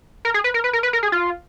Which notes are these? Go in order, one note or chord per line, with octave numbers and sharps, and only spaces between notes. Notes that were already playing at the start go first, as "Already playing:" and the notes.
A#4
G#4
B4
A#4
B4
A#4
B4
A#4
G#4
F4